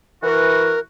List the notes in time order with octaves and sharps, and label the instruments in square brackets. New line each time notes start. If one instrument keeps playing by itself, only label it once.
[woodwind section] E3 F#4 [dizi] A#4